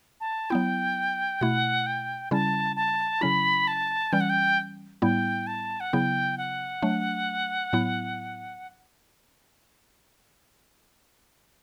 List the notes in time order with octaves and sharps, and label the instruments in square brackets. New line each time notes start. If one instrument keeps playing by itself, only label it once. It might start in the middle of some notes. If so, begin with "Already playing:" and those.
[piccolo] A5
[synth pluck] F#3 B3 E4 [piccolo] G5
[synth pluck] B2 A3 E4 [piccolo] F#5
[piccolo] G5
[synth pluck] C#3 G3 C#4 E4 [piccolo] A5
[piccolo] A5
[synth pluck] C#3 F#3 C#4 E4 [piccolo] B5
[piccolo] A5
[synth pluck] E3 G3 C#4 [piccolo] G5
[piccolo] F#5
G5
[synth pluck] A2 G3 B3 E4 [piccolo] G5
[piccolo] A5
F#5
[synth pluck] C#3 F#3 B3 E4 [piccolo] G5
[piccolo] F#5
[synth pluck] F#3 A3 D4
A2 F#3 B3 E4